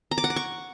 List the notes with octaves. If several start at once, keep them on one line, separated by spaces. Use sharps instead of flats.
A#5
D6
F#5
D6
C#6